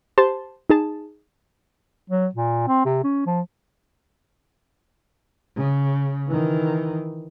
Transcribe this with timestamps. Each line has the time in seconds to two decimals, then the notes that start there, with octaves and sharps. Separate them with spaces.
0.18 G4 C5 A5 C6
0.70 D#4 G#4 A5
2.10 F#3
2.35 A#2
2.68 C4
2.85 C3
3.04 C#4
3.27 F3
5.56 C#3
6.28 D#3 E3